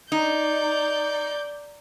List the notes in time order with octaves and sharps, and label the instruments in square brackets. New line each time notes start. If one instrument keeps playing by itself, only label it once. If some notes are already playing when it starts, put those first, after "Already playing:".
[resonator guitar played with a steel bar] D#4 [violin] D5 G6